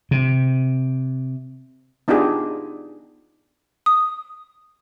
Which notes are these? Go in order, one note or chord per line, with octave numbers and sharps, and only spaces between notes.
C3
B3 D4 D#4 F4 G4 G#4
D#6